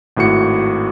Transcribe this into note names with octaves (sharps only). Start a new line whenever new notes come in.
G#1 A2 F#4 C#7